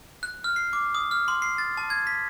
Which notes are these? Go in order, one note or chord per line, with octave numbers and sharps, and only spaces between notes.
F#6
F6
C7
D6
D#6
F6
C6
C7
A6
A5
G#6
B6